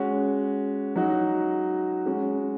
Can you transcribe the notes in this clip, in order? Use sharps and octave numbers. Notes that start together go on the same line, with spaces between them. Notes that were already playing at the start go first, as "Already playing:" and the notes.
Already playing: G#3 C#4 F#4
F#3 D#4 F#4
G#3 C#4 F#4